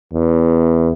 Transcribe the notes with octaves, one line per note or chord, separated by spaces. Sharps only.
E2